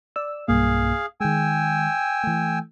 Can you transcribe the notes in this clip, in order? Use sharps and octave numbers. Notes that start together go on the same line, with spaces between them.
D5 E6
B1 G2 A#3 G#4 F5
D#3 G#3 G5 G#5 E6
E3 A3